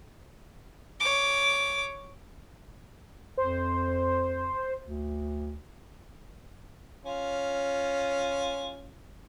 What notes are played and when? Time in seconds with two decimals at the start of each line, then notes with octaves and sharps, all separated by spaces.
1.00 C#5 D6
3.38 F2 C5
4.84 D2
7.06 C#4 F4